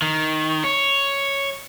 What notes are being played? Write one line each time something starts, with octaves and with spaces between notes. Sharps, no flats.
D#3
C#5